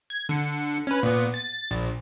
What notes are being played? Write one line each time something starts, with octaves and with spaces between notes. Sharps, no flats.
G#6
D3 C#7
C#4 B4
A#2 B3
A6
A#1